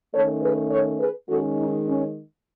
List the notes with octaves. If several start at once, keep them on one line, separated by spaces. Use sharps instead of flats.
D#3 A3 C#4 A4 C#5
G#4 B4
A4 C#5
G#4 B4
D#3 G#3 C#4 F#4 A4
D#4
C#4